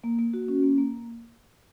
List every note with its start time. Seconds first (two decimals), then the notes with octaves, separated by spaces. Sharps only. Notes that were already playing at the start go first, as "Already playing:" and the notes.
0.04 A#3
0.19 A#3
0.34 F#4
0.48 C#4
0.63 A#3
0.78 A#3